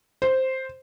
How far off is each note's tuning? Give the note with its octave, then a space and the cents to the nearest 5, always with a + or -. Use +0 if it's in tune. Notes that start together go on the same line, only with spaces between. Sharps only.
C5 +0